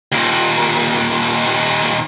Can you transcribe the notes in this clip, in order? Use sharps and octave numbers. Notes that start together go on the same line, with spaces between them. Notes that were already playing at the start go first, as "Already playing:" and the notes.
D#2 A#2